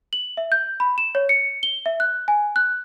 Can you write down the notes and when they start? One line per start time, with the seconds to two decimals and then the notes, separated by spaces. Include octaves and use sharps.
0.13 F#7
0.37 E5
0.52 G6
0.80 B5
0.98 E7
1.15 C#5
1.29 C#7
1.63 G7
1.86 E5
2.00 F#6
2.28 G#5
2.56 F#6